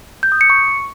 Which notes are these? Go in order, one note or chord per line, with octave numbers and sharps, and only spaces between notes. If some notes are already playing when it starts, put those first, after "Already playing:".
G6
D#6
C#7
C#6